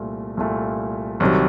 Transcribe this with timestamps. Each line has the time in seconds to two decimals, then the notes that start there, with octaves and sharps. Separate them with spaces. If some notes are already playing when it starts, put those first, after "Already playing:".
Already playing: C2 A#2 A3
0.37 C2 A#2 A3
1.20 C2 C3 D#3 F#3